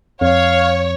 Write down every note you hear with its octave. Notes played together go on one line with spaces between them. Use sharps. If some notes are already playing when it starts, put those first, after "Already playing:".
F2 C#5 F5